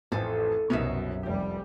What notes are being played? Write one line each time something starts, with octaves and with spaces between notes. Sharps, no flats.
A1 F2 A4 G#5
C2 F#2 B2 C#4 D#4 E5
F1 G3 G4